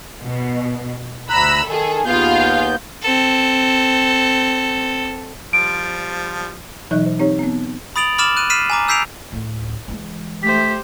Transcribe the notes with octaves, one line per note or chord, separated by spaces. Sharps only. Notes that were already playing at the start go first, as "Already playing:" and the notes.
B2
D2 A#5 B5 E6 F#6
D#3 G#4 A4
D#2 B3 F4 G#4 F5 G6
C4 A4
F3 G3 C5 D7
B2 E3 F#3 D#4 D#5 F#6
C5
C4 D#4 G4 C#5
B3 C4
B5 D#6 A6 D7 F7 F#7
B5 D6 F6 A6 E7 F#7
F#6 D#7
F6 B6 C7 D#7 E7
G#5 A#5 D6
E6 G6 B6 C7 D7 F7
D2 A2
E3 G#3
A3 G4 C5 B6